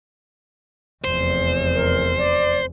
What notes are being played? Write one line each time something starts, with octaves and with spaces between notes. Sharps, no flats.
F1 E2 C5
A#4
D5